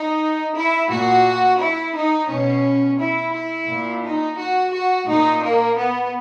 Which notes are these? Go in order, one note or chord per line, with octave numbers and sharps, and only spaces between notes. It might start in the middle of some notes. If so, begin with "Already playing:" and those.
Already playing: D#4
E4
A#2 F#4
E4
D#4
B2 C#4
E4
E4
A#2
D#4
F#4
F#4
A#2 D#4
A#3
B3